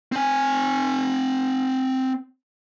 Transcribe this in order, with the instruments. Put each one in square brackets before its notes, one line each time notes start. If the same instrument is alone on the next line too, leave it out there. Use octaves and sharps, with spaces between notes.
[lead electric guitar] C4 G#5